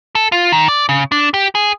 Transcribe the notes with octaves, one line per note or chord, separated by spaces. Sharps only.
A4
F4
D#3
D5
C#3
D4
G4
G#4